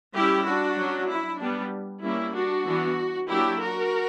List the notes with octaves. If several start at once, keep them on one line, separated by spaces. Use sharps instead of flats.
G3 C#4 E4 G4
D4 F#4
F#3 C#4
E4
G3 B3 D4
G3 A#3 C#4 E4
D4 F#4
E3 B3 D4
F#3 A#3 D4 E4 G4
F#4 A#4